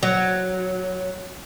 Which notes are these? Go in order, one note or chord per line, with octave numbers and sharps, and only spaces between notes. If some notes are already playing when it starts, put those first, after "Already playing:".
F#3